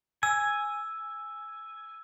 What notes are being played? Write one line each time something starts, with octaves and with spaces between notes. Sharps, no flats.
G#5 E6